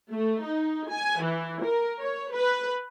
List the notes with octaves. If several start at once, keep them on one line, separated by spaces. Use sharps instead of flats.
A3
D#4
G#5
E3
A#4
C#5
B4